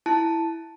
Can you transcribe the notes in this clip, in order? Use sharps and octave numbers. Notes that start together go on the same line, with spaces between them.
E4 A5